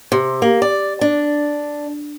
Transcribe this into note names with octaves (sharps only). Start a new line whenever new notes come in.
C3
A#3
D5
D4